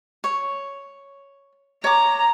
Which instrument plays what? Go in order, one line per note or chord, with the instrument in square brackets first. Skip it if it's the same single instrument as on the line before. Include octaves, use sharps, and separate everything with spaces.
[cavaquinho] C#5
[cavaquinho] C#5 D6 [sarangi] A#5